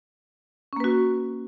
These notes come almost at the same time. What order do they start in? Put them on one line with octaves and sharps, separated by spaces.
C#4 A#3 B4 F#4